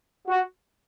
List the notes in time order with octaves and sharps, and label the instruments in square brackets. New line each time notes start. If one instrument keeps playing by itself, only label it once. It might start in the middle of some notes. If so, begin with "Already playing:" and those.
[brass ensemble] F#4